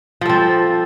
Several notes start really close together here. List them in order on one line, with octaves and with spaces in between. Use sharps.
F3 A4 C4